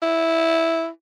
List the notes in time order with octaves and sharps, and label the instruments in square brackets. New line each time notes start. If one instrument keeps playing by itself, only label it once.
[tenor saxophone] E4